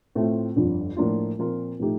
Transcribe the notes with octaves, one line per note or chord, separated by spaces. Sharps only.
A2 A3 C4 F4
G1 F2 D3
A2 F3 A#3 D4 F4
A#2 F3 C4 F4 A#4
A2 F3 A3 D#4 G4